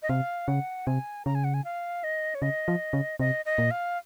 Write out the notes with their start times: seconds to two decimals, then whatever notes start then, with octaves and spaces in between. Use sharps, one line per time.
0.03 D#5
0.09 C3 F5
0.48 C#3 F#5
0.87 C3 G#5
1.25 C#3 A#5
1.35 G#5
1.44 F#5
1.54 G#5
1.64 F5
2.04 D#5
2.35 C#5
2.42 C#3 D#5
2.68 F3
2.93 C#3
3.20 C3 D#5
3.45 D#5
3.58 A#2
3.71 F5